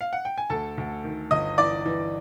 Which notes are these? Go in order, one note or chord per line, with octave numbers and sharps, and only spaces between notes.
F5
F#5
G5
G#5
D2 A4 A5
D2
D#3
G1 D#5 D#6
E3 D5 D6
E3